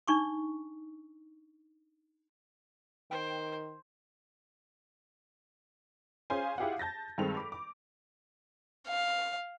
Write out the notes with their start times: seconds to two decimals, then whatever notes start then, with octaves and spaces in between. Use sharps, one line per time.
0.08 D4 D#4 C#6 D6
3.11 D#3 C5 G5
6.30 C#4 F4 G#4 C5 F5 G#5
6.58 E4 F4 G4 G#4 F5 F#5
6.79 A5 G6 A6 A#6
7.18 G2 D#3 G#3 C4 A4 F7
7.37 B5 D6
7.52 D6
8.88 F5